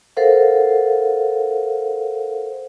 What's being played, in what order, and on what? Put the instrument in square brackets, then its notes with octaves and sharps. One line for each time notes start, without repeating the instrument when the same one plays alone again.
[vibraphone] A4 A#4 C5 F5 F#5